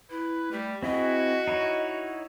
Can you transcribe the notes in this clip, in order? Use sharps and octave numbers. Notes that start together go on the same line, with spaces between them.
E4 B4
G3 A3
C4 E4 F#4 G#4 D#5
D#4 E4 C#5